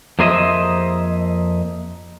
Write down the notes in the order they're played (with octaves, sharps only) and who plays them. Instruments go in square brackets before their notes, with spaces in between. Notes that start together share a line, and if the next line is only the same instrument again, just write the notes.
[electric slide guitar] F2 A#3 G#4 C5 D#5 E5